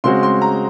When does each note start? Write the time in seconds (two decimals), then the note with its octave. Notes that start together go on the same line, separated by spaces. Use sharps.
0.04 C#3 G#3 C4 F#4 C6
0.23 C6
0.42 A#5